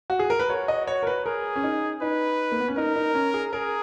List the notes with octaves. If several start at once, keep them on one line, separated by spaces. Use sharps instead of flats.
F#4
G#4
A#4
B4
F#4 C#5
D#5
C#5
A#4
B4
G#4 A#4
C#4
D#4
D#4 B4
A#3
B3
C#4
D#4 A#4
D#4
C#4
G#4
G#4 A#4